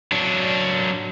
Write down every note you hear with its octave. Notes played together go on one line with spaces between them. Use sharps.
F#3 D4